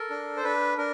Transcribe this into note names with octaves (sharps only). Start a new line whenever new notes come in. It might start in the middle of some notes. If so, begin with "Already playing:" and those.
Already playing: A4 A#4
D4
C5
D4 B4
D4 A#4